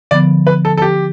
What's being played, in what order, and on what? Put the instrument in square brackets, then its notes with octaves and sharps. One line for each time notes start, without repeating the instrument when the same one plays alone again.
[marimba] D3 F3 B3 [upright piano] D5
[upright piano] B4
A4
A4
G4